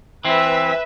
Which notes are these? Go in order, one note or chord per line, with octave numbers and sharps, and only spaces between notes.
E3 C4 B4 E5